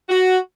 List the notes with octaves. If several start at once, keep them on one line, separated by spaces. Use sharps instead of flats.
F#4